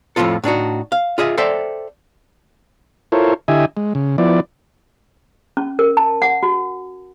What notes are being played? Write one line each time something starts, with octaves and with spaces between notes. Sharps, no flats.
F2 A2 C#3 F3 F4 A4
A2 D4 D#4 F#4
F5
F4 G#4 D#5 E5
A4 C5 D5 E5 G5
E4 F4 A4 A#4 C5 C#5
D3 E4 G4 D#5 E5 G#5
G#3
C#3
F3 B3 E4 D5
C#4
A#4
A5
F#5
F#4